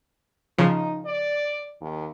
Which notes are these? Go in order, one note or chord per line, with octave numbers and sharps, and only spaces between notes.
C#3 F3 D#4
D5
D#2